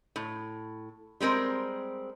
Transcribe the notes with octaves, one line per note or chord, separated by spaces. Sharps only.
A2
G3 G#3 C4 A#4